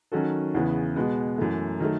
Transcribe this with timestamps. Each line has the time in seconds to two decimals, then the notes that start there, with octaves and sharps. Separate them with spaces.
0.12 D#3 F#3 C#4 F#4 A4
0.54 E2 C#3 E3 B3
0.96 B2 G#3 B3
1.38 F#2 E3 A3
1.80 D#3 F#3 A3